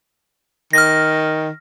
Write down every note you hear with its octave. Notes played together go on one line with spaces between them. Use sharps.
D#3 F6 A#6